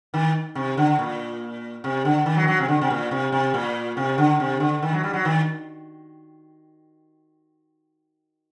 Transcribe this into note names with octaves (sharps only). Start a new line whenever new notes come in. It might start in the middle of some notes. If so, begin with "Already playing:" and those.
D#3
C3
D3
A#2
C3
D3
D#3
F#3
D#3
F#3
C3
D3
C3
A#2
C3
C3
A#2
C3
D3
C3
D3
D#3
F#3
G3
F#3
D#3